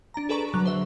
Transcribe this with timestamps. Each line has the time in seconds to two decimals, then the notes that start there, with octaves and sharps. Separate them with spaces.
0.14 D4 A#5
0.29 G#4 A4 B4 D5 A#5 C#6
0.54 D3 F#3 F#6
0.66 C5 E5